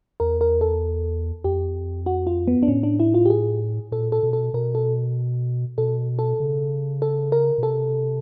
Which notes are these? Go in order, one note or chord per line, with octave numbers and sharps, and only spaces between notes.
E2 A#4
A#4
A4
F2 G4
F#4
F4
B3
D4
A2 C#4
D4
E4
F4
G4
G#4
A#2 A4
A4
B2
A4
B2 A#4
A4
B2 A4
A4
C#3
A4
A#4
B2
C3 A4